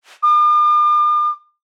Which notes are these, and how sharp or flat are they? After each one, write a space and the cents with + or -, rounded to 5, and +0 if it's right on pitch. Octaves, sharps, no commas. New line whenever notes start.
D6 +45